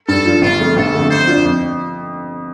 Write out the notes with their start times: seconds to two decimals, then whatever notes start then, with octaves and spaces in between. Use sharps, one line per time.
0.08 G2 A4
0.25 F3 D4 F4
0.42 G1 F4
0.59 F2 F3 A3
0.76 G1 A4
0.94 F2 D3 A3
1.10 F2 C5
1.27 F3 D4 F4
1.44 F2